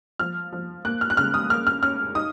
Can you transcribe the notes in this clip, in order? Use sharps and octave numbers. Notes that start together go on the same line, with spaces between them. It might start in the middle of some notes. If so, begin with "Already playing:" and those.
F3 F6
F3
A#3 F#6
F6
F#6
C#3 F6
D#6
A#3 F6
F6
C#4 F6
D#4 D#6